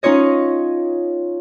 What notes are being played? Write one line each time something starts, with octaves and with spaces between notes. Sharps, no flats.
C#4 D#4 F4 C#5 D#5